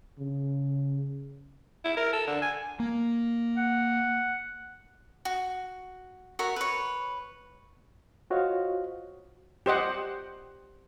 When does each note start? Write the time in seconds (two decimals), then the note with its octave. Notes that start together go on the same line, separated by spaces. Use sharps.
0.19 C#3
1.85 E4
1.97 A#4
2.13 A4
2.27 D3
2.42 G#5
2.80 A#3
3.57 F#5
5.25 F#4
6.39 F#4 A#4 C#5 E5
6.56 B4 C#5
8.30 F4 F#4 C5 C#5 D#5 F5
9.66 G4 C5 D#5 F#5